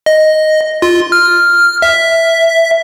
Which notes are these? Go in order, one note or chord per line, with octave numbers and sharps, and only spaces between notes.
D#5
F4
F6
E5